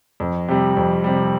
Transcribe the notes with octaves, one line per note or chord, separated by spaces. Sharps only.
F2
C3 G3
F2
C3 G3